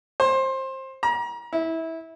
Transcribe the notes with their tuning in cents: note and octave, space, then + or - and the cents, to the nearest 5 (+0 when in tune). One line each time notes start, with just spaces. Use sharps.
C5 +20
A#5 +35
E4 -20